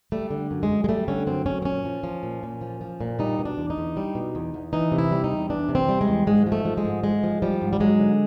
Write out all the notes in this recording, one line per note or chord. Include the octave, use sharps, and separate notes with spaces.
G3 A3
D3
F#2
G#3
F#2
G#3
G3 A3
D3 C#4
F#2 C4
F#2 C#4
C4
A#2 C#4
F3
F3
A#2
A#2
F3
F3
A#2
G3 D#4
B2
D4
E2
D#4
E2
G3
B2
E2
E2
E3 D#4
C3
E4
G3
D#4
E2
E3 D4
C3
C4
G3
G#3
E2
G#2 G#3
F3
A3
F3
G#3
G#2
G#2 G#3
F3
F3 G3
G#2
G3
F#3 G#3
D3